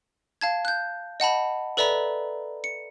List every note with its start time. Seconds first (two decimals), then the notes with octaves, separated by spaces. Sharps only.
0.41 F5 A5 G#6
0.65 F#6 G6
1.20 D#5 F#5 A5 B5
1.77 A4 B4 D5 E5 A#5 B5
2.64 C#7